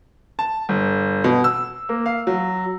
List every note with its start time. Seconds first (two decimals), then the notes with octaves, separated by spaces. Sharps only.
0.39 A5
0.69 G1
1.24 B2
1.44 E6
1.89 A#3
2.06 F5
2.27 F#3